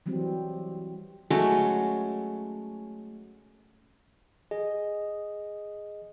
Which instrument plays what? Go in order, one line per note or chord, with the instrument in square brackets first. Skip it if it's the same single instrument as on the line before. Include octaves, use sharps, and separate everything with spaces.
[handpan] E3 F#3 G3 C4
[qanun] F#3 G#3 A3 C#4
[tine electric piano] G#4 D#5